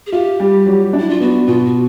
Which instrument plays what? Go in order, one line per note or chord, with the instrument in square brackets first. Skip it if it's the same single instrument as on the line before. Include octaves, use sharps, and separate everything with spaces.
[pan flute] G#4
[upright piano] F4 [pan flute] G4
[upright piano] G3
F#3
D4
[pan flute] E4
F4
[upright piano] B3 [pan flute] F#4
[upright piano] B2 [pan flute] F4
[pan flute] F#4